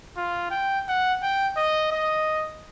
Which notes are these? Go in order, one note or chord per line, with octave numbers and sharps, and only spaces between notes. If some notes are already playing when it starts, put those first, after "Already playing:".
F4
G5
F#5
G5
D#5
D#5